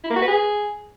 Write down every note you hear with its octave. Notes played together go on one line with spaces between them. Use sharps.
E4
A#3
F#4
B4
G#4